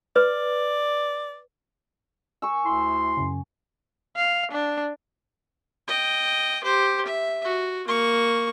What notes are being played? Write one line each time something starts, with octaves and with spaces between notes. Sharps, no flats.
B4 D5
G#5 C#6 E6
D2 E4 C6
F#2 C#3
F5
D4
D#5 G5
G4 C5
E5
F#4
A#3 C#6